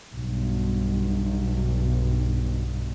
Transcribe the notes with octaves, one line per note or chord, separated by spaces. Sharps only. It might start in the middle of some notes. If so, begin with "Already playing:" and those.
B1 G2